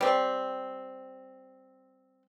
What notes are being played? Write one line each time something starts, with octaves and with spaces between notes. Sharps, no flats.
G3 C4